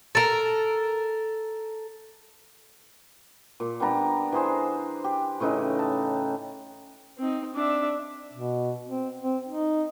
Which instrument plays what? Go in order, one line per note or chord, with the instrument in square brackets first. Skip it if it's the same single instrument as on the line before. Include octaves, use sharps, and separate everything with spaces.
[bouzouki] A4 A#4
[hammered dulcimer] A#2
G3 B3 D4 A#5
E3 G#4 C5
G4
A2 C#3 E3 D#4
A5
[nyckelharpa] C4 D#4
D4 E5
[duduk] B2
C4
C4
D#4